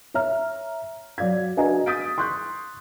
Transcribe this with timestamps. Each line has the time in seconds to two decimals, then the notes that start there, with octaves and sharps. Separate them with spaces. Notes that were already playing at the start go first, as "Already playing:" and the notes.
0.14 C#5 E5 A#5 F6
1.18 F#3 D5 F5 G#6
1.57 D4 F#4 B4 D#5 G#5 A#5
1.86 D#6 G6 A6 B6 D7
2.18 C6 C#6 F#6 G6